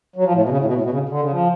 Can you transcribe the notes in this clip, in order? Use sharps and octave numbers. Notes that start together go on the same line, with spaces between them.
F#3
F3
A2
B2
C#3
A2
B2
A2
B2
C#3
D3
C#3
F3